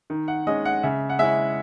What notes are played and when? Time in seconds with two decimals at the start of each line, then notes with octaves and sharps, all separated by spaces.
0.10 D#3
0.28 F#5
0.47 G#3 C#4 D#5
0.65 F#5
0.83 C#3 E5
1.10 F#5
1.19 G#3 C#4 E4 E5